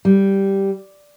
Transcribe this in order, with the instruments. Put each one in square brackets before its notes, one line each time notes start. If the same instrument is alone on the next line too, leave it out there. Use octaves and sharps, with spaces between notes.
[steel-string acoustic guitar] G3